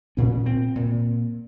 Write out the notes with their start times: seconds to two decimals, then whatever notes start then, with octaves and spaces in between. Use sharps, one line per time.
0.17 A#2 C#4
0.46 C4
0.76 A#2